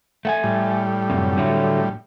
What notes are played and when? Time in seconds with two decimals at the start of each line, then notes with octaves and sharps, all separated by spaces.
0.25 A3 F#5 G#5
0.44 A2 G3
1.10 F#2 C3
1.37 D3 F#3 A3